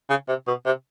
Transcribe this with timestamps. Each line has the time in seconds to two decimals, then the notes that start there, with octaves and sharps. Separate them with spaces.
0.09 C#3
0.28 C3
0.47 B2
0.66 C3